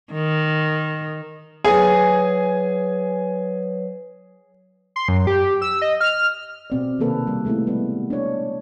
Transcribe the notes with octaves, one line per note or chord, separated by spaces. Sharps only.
D#3
F#3 G#4 B4 C#5 G#5
C6
F#2
G4
E6
D#5
F6
B2 C4 D5
C3 D#3 A#3 A4 B4
G3
G#3 A3 B3 E4
G3 B3
D4 C#5